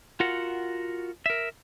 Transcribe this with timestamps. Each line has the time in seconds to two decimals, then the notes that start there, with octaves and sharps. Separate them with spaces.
0.20 F4 F#4 A#4 F#5
1.26 A#4 E5